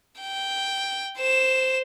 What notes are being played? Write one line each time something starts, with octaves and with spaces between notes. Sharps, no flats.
G5
C5 E7